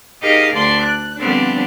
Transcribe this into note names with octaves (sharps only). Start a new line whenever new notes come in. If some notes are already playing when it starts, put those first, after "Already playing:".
D#4 G4 G#4 A#4 D#5 F5
D2 D4 D5 C6
F#6
D3 F3 G3 B3 C4 D4